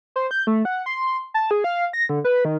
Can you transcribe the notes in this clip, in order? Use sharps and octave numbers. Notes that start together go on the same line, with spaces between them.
C5
G6
A3
F#5
C6
A5
G#4
F5
A#6
D3
B4
D#3